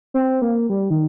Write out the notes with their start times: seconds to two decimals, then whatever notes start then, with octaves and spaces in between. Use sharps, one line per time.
0.14 C4
0.42 A#3
0.70 G3
0.90 D#3